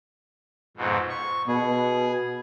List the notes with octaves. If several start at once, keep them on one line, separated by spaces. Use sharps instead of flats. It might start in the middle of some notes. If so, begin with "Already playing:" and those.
F2 G#2 B2
C#6
B2 G#4